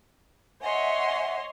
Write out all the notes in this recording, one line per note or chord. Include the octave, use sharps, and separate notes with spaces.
C#5 D#5 E5 F#5 G#5 C6